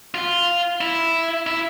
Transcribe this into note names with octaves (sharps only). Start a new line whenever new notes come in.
F4
E4
E4